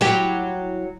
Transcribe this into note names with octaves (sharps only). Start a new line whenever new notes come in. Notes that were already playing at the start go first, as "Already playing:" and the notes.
F#3 E4 G4